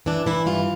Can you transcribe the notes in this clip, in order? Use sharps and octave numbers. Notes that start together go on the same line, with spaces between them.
E3 D4
E3 E4
G2 F4